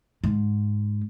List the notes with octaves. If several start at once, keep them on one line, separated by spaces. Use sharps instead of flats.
G#2